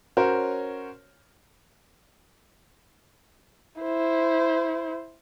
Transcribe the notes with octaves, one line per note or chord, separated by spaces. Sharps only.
C#4 F#4 A#4 C5 C#5
E4 C5